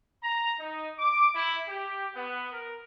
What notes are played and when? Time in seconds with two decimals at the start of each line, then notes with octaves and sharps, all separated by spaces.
0.22 A#5
0.59 D#4
0.98 D6
1.34 E4
1.68 G4
2.15 B3
2.51 A#4